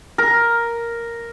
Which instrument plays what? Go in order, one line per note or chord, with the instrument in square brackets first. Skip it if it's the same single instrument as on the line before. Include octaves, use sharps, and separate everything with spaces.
[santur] A#4